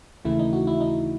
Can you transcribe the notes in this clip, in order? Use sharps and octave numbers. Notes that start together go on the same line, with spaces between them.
D#2 C#3 E3 A3 E4
D#4
F#4
E4
D#4